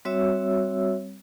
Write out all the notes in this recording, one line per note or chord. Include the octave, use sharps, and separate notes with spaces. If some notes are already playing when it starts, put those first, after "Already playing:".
G3 C4 F#4 C#5 E5 E6